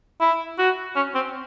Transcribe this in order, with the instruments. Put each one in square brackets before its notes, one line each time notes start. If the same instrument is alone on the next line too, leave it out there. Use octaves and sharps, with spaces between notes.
[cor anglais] E4
F#4
C#4
C4